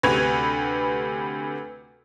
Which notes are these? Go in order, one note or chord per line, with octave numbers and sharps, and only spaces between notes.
D2 C3 B4 G#6 D#7 F7